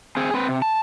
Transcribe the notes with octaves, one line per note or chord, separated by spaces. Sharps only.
C4 G#4
C4 B4
C3
A5